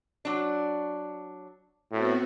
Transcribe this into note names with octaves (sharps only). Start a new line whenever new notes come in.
F#3 D4
A2 B3 C4 F#4